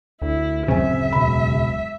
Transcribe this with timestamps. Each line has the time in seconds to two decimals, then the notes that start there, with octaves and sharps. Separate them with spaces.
0.22 D2 E4
0.68 D1 F#2 C#3 C4 E5 G#5
1.13 E1 B5